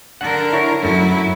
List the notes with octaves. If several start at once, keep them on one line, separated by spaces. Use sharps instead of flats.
D3 A#4 F#5
E4 C#5
F#2 F#3 A3 E4